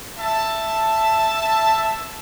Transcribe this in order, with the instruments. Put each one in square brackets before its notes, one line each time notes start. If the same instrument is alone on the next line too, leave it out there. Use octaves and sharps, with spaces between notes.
[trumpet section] E5 A5